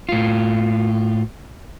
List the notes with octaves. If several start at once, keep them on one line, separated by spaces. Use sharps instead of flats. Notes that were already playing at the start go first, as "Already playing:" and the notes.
A2 F4